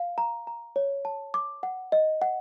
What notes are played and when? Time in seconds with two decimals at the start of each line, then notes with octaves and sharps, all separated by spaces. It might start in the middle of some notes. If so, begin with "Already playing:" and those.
Already playing: F5
0.18 A#5
0.47 A#5
0.76 C#5
1.05 A5
1.34 D6
1.63 F#5
1.92 D#5
2.22 F#5